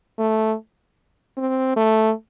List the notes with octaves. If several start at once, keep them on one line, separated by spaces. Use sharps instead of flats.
A3
C4
A3